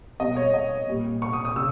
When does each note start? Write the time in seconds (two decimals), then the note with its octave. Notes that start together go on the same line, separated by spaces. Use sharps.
0.20 B2 G3 D#5
0.36 C#5
0.54 D#5
0.87 A#2 G3
1.22 C#6
1.33 D#6
1.45 D#6
1.56 C#3 E6